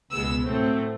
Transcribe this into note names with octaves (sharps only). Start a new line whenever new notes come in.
C#2 B2 G#3 B3 E6
A2 F#3 A3 C4